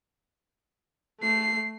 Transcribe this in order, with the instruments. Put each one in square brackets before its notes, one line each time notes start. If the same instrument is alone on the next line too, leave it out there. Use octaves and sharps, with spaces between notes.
[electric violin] A3 C7